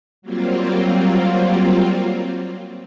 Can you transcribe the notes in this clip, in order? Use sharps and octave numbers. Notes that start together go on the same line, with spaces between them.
F#3 G3 A#3 C4 F4